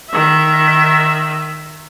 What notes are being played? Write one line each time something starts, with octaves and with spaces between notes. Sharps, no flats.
D#3 E5